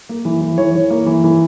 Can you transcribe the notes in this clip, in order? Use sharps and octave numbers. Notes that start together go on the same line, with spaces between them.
A#3
E3
E3
E3 C#5
E3
A#3
E3
E3